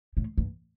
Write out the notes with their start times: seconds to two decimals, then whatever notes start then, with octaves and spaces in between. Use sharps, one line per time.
0.17 A2
0.38 G2